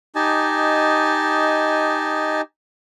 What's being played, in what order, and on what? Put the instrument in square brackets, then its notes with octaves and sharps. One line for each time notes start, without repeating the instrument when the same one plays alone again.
[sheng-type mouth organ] D#4 G4 D#5 G#5 A5